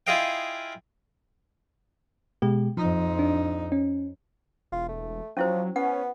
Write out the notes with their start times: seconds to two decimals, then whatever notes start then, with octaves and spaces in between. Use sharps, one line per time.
0.07 E4 F4 G#4 D#5 F5 G5
2.42 B2 G#3 G4
2.77 F2 F3 D#4
3.19 D4
3.72 C#4
4.72 E1 F4
4.88 A3
5.37 F3 F#3 C#4 E4 C5
5.76 B3 C#4 F#5